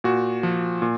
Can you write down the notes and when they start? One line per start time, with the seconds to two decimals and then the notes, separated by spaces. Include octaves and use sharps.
0.04 A#2 F#4
0.43 F3
0.82 A#2